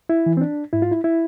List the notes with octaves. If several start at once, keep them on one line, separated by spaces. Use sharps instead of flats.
E4
E3
C4
D4
G#2 E4
F4
E4
E4